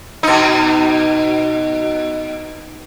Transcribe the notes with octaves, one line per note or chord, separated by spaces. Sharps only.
B2 D#4